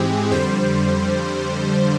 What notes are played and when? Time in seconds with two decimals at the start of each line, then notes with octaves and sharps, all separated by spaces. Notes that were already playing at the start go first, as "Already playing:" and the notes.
Already playing: G#2 E3 G#3 C4 G4 G#4
0.31 F2 D3 G3 C5